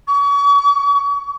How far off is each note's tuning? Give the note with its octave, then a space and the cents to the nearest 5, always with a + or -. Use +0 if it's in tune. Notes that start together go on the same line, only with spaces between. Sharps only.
C#6 +40